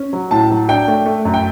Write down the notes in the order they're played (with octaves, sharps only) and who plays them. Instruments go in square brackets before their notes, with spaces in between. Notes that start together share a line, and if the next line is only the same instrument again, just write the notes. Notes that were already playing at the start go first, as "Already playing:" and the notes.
Already playing: [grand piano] C#4
F#3
A2 A5
F#3
D4 G5
A3
A3
F#2
G5